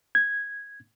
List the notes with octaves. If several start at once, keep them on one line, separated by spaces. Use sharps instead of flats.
G#6